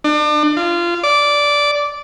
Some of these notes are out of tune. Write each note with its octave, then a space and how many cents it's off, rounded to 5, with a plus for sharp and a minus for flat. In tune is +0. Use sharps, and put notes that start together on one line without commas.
D4 +35
F4 -20
D5 -10